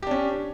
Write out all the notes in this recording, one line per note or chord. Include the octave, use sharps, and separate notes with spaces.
C#4 D4 G4